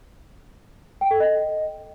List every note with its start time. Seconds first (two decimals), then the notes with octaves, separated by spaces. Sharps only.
1.01 G5
1.11 A4
1.20 D#5